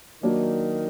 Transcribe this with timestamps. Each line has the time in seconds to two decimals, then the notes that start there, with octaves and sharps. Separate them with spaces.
0.23 D#3 F#3 A#3 D4